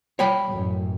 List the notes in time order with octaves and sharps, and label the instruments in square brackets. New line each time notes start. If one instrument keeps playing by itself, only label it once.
[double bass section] G3 [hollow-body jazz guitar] C#5 G5 B5
[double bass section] A1 F#2